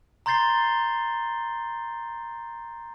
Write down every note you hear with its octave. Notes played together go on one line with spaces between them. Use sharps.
A#5 C6 G6 A6 C7 G7